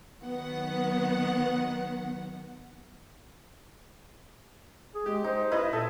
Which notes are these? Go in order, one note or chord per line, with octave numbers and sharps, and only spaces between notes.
D#3 F#3 B3 F#5
G#4
G#3 G4
D#4 C5
E4 B4 D#5
A#2 A4 E5